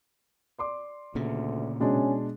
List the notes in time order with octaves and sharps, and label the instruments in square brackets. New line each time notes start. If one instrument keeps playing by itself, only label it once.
[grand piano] D5 C6 D6
[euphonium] D2 [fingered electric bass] A#2 C#3
[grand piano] B2 G#3 D4 [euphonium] C#4